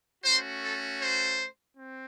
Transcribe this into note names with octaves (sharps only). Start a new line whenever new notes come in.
A3 C#4 F#4 C5
A4
C5
C4